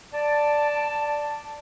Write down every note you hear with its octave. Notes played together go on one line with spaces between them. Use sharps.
D5 A5